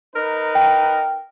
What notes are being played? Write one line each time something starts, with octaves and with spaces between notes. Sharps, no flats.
D#4 A#4 B4
G5